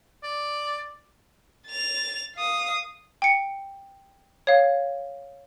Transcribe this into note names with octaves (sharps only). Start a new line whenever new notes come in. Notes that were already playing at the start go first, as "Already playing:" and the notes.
D5
A6 F7
F5 D#6
G5 C#7
C#5 F5